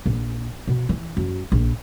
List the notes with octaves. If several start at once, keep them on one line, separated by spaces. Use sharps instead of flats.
A#1
B2
E3
F#2
A#1